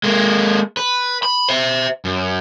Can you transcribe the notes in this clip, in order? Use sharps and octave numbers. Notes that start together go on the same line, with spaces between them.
G#3 A#3
B4
B5
C5 E5
F#2